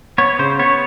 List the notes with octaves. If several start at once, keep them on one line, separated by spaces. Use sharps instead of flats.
B3 C#5
C#3 C5
B3 C#5